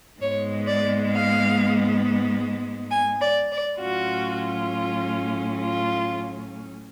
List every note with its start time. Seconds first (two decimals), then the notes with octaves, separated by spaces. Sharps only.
0.21 G#2 G#3 B3 C#5
0.66 D5
1.11 F5
2.90 G#5
3.21 D5
3.51 D5
3.80 A2 F#3 C#4 F4 F#4
5.61 F4